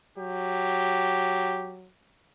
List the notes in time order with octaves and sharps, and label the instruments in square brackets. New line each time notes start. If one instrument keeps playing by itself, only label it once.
[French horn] F#3 [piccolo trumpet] G4